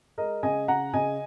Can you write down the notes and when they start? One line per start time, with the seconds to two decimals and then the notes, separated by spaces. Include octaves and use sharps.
0.18 G#3 A#4 D#5
0.43 C#3 D#5 G#5
0.68 C#3 F#5 A#5
0.93 C#3 D#5 G#5